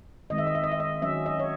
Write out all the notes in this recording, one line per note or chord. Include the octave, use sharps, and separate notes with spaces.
D#3 G#3 C4 D#5
E5
D#5
E5
D#5
E5
D#5
D#3 F#3 C#4 E5
D#5
C#5